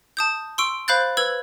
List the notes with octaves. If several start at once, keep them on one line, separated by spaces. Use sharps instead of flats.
A5 D#6 G6
C6 C#6 E6 D7
C5 F5 B5 F#6 G6 A6
B4 E6 G#6 F#7